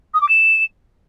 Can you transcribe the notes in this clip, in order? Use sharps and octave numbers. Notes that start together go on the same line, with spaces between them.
D#6
D6
E7